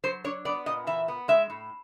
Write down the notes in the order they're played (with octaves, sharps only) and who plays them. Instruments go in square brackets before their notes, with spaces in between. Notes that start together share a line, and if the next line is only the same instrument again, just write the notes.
[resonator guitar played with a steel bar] F#3 C5
D4 C#5
B3 D5
A#2 D#5
E3 E5
B3
G#3 E5
A2